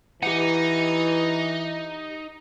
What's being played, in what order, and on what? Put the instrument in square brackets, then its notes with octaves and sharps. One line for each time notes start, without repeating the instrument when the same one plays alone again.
[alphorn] E3 [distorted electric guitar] D#4 [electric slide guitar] G4 F#5